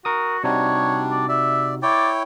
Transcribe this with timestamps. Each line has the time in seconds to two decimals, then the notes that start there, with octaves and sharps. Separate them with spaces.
0.05 F#4 A#4 D#6
0.44 C3 G3 D4 D#4 F#4 C#5
1.10 D5
1.29 D5 E5
1.83 E4 C#5 D5 G5